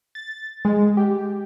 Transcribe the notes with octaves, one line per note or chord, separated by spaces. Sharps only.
A6
G#3
G4